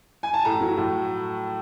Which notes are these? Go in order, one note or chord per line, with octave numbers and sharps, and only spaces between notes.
G#5
A5
A2 A#5
F#3 A3
A2